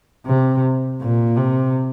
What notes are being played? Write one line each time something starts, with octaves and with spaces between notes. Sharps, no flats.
C3
A#2
C3